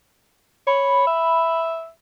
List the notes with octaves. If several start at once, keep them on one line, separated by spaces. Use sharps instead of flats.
C#5 B5
E5